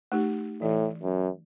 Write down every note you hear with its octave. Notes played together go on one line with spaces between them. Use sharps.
A3 D#4 G4
A2 E3
F#2